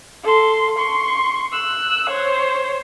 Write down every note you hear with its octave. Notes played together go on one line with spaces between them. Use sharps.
A4 C6
C6 C#6
E6 F#6
C5 C#5